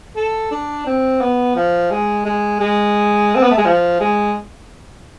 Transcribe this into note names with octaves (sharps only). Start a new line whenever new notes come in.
A4
D4
C4
B3
F3
G#3
G#3
G#3
C4
B3
A3
G#3
F3
G#3